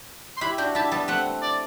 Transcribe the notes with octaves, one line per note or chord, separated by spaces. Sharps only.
C6
E4 G4 B5
D4 F#4 G5
E4 G4 A5
G3 B3 A5
A3 C4 F#5
D5